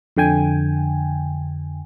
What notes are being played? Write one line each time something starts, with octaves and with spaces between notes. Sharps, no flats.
F2 D3 G5 G#5